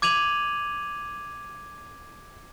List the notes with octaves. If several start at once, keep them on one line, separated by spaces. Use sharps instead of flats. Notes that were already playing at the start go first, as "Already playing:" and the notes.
D6 G#6 D#7 F7 F#7